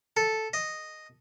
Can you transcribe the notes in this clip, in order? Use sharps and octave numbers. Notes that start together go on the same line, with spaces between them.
A4
D#5